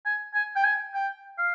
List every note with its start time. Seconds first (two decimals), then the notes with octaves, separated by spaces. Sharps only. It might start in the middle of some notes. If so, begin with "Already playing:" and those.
0.05 G#5
0.34 G#5
0.56 G5
0.64 G#5
0.94 G5
1.38 F5